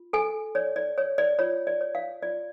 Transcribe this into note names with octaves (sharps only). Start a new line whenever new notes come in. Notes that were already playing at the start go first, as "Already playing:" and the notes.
Already playing: F4
A4 G#5
C#5 D5
D5
C#5
D5
F4 C#5
D5
C#5
F5
F4 D5